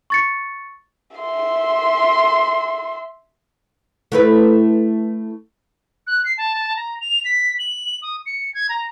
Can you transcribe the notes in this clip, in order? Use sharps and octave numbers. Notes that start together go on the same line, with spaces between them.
C#6 A6 C#7
E5 C6
A3 E4 B4
F#6
C7
A5
A#5
F7
B6
F#7
D#6
C#7
G#6
A#5